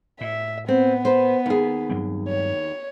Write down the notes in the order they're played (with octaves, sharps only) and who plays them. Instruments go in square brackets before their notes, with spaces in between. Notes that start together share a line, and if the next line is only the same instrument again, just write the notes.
[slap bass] A2 [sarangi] E5
[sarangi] B3 [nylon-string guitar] C4
[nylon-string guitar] B4 C5
D#2 G#4
[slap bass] G2 F#3 C4
[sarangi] C#5